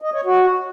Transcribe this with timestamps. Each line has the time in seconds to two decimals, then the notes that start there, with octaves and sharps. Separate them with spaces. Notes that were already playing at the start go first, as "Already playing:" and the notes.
0.02 D#5
0.13 C#5
0.25 F#4